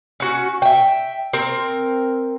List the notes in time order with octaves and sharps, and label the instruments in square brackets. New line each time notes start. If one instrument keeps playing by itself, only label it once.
[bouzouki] C#4 F#4
E5 G5
C4 A#4